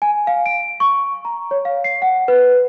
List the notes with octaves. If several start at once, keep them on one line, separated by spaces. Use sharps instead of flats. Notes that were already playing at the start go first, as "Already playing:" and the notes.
G#5
F5
D7
C#6
A#5
C#5
F5
C7
F#5
B4